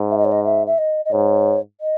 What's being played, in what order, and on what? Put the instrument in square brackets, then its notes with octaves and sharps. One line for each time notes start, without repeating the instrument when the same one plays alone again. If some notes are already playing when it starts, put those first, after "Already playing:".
Already playing: [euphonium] G#2
[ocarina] E5
D#5
C#5
D#5
E5
E5
D#5
D#5
[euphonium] G#2 [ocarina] C#5
[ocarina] D#5